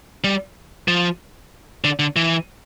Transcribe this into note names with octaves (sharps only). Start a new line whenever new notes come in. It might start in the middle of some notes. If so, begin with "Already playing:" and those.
G3
F3
D3
D3
E3